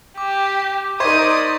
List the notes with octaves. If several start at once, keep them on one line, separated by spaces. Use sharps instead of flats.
G4 D6
D#4 A#4 C5 D5 C#6 D#6 G#6 B6